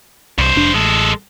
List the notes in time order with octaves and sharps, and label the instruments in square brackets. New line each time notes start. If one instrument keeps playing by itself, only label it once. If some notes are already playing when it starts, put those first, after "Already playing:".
[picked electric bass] C2 [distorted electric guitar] G2 C5
[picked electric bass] F1 D4
[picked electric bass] A1 [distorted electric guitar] G#3 A4